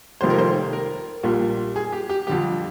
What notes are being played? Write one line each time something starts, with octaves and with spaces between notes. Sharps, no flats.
F1 F2 D#3 G3 C5
A#4
C5
A#4
A#1 A#2 G3
G#4
G4
G4
F2 D3 G3 G4